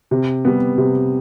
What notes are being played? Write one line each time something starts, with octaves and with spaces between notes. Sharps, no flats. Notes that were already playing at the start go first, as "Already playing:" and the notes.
C3
G3 B3
C3